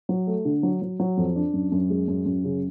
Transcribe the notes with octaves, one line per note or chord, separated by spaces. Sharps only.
F#3
A3
D3
F#3
F#3
F#3
F2
D4
F#2
F#2
G#3
F#2
F#2
C#3